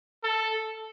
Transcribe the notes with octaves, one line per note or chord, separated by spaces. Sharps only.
A4